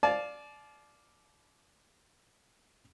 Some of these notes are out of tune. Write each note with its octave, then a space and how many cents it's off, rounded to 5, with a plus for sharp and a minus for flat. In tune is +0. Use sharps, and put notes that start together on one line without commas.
D5 +0 F5 +0 A5 -45